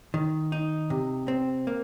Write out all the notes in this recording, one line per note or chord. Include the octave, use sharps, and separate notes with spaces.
D#3
D#4
C3
C4
A#3